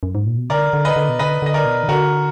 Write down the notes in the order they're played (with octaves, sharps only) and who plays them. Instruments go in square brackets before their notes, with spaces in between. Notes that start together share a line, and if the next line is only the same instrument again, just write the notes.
[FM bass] F#2
G#2
A#2
B2
[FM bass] D3 [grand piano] A#4 D5
[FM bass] D3
[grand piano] B4 D#5
[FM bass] D3
B2
[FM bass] D3 [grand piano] B4 D#5
[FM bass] D3 [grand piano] D#5
[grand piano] A#4 D5
[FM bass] B2
D#3
[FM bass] D3 [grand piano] F#4 A#4